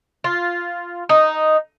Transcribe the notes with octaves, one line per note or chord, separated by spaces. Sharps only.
F4
D#4